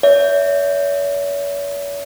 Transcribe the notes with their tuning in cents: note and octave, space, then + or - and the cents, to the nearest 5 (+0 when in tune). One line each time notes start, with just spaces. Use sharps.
C#5 +40 E5 +0